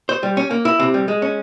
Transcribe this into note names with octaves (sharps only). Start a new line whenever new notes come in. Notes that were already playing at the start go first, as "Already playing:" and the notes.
C5
G3
C#4
A#3
E4
C3
G3
G#3
C#4